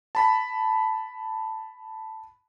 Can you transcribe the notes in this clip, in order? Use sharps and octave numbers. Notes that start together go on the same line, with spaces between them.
A5 B5 B6